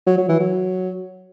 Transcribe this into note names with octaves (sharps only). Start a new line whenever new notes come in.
F#3
F#3
E3
F#3